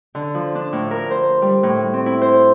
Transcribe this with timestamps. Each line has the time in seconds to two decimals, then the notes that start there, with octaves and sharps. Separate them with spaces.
0.15 D3
0.35 F3
0.55 D4
0.73 A2
0.91 A#4
1.11 C5
1.42 G3
1.63 A2
1.94 C4
2.06 E4
2.21 C5